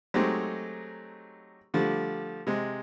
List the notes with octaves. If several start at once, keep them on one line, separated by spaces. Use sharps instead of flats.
F#3 G#3 A3 C4 D#4 G4
D3 F3 G3 A3
C3 G#3